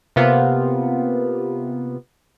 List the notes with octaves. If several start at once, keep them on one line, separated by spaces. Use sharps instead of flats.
C3 A#3 B3 F4